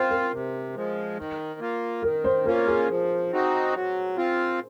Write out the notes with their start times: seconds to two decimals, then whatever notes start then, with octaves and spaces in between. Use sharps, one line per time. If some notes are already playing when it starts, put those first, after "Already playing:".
Already playing: C4 F4 A#4 C5
0.10 A#4
0.32 C3
0.75 F3 G#3
1.17 D#3
1.60 A#3 F4
2.02 D#3 A#4
2.24 C5
2.45 A#3 C#4 F4 A#4
2.67 G#4
2.89 F3
3.31 C4 D#4 F#4
3.74 F#3
4.17 C4 F4